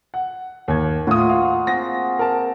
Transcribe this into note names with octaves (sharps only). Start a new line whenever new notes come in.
F#5
D#2 G#6
A2 A#3 F4 F#4 D#6
F5
C4 F#4 G#4 A#6
A#4 A5